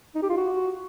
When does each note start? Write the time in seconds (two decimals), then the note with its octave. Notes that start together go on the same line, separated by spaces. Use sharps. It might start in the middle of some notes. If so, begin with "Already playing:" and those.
0.15 D#4
0.22 G4
0.30 F4
0.37 F#4